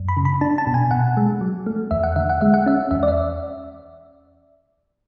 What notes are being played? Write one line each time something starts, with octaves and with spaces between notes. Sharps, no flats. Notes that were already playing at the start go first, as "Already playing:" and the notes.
Already playing: F#2
B5
C#3
B5
D4 A5
A5
B2
G#5
B2 F#5
G#3
F#3
A3
E2 E5
F#5
D3 E5
F#5
G#3 E5
F#5
C#4 E5
E2 E5
D5
E5